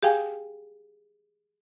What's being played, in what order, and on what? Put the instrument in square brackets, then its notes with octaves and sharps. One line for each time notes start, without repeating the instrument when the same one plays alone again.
[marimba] G4 G#4 F5 G5 G#5